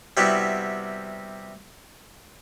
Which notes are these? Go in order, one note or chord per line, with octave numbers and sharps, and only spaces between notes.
C3 G3 B3 E4 F#4